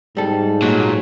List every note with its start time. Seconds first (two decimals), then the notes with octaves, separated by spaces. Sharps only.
0.17 G#2 G3 A4
0.62 A#2 F#3 D#4